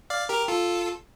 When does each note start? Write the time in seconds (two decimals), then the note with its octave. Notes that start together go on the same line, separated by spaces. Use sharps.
0.10 D5 F5
0.29 G4 A#4
0.48 F4 A4